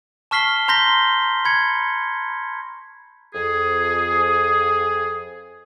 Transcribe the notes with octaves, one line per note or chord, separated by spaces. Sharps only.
A5 C#6 F6 B6 C7 G7
A#5 C6 G6 A#6 B6 G7
B5 G#6 C#7
F2 G#4